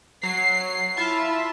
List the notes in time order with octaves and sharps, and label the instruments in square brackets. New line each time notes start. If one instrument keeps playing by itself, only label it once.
[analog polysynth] F#3 [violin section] C7
[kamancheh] E4 [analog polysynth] F4 E5 A5